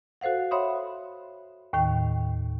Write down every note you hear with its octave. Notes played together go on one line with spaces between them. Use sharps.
F#4 A4 C5 F5 F#5
C#5 E5 F#5 B5 C6 D#6
D#2 A2 D#3 G5